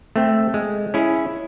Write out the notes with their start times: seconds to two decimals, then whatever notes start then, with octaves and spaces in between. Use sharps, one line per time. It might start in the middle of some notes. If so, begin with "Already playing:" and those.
0.16 A3 C4
0.54 G#3
0.94 C#4 E4 G#4